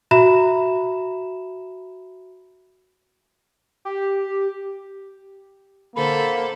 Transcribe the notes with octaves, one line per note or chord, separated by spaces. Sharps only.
F#4 E5 A#5 B5 E7
G4
D3 A#3 A4 C5 B5